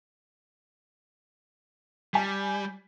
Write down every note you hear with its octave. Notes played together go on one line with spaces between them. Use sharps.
G3 G#5 B6